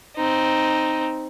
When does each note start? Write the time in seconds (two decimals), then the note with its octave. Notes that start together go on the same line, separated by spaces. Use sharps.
0.16 C4 D#4